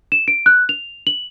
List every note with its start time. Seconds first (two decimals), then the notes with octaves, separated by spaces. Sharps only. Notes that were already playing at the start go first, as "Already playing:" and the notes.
0.12 E7
0.28 D7
0.46 F#6
0.69 F7
1.07 F#7